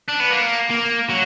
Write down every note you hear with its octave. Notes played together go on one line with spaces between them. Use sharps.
D4
B3
A#3
A#3
F#3